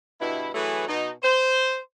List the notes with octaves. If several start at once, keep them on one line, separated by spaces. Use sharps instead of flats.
G2 B2 E4
E3 F#3 A3 G#4 B4
B2 D#4
C5